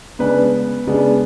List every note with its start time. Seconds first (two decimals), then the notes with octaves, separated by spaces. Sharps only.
0.19 C#3 G#3 B3 D4 B4
0.87 C#3 G#3 B3 D4